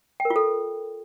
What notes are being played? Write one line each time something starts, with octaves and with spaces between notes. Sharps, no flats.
G5
A#4
F4
A4